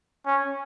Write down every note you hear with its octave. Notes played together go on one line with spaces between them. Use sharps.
C#4